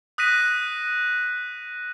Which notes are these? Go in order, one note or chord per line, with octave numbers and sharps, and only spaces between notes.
D#6 F#6 A#6 B6 D#7